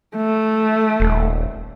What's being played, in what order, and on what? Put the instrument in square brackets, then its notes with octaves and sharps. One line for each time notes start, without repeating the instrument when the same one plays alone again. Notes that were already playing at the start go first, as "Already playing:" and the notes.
[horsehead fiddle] A3
[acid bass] D#1